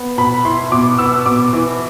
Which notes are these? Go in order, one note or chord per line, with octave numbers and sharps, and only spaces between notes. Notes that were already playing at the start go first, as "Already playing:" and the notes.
Already playing: B3
B2 B5
E4 C6
B2 D6
B3 E6
B2 D6
E3